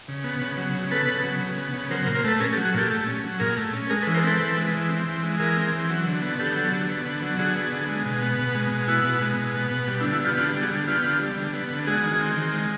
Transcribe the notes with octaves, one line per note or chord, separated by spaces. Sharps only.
C#3
B3
C#3
F#3
C#3
B3 A4 B4
C#3
F#3
C#3
B3
C#3
F#3 A#4 C5
A#4 C5
A#2
A#4 C5
A3 A4 B4
C#4 G#4 A#4
G4 A4
F#3
F#4 G#4
A#2 G4 A4
A3
C#4
F#3
A#2 G#4 A#4
A3
C#4
G#3 G#4 A#4
A4 B4
E3
A#4 C5
C4 A4 B4
E3
G#3
E3
C4
E3
G#3
E3 G#4 A#4
C4
E3
F#3
D3
B3
D3 G4 A4
F#3
D3
B3
D3
F#3
D3 F#4 G#4
B3
D3
G#3
B2
B3
B2
G#3
B2
B3 E4 F#4
B2
G#3
B2
B3
B2
G3
D4 E4
D3
E4 F#4
B3 F4 G4
D3 F4 G4
G3
F#4 G#4
D3
B3 F4 G4
D3
G3
D3
B3
D3
G#3 F#4 G#4
D#3
C4
D#3
G#3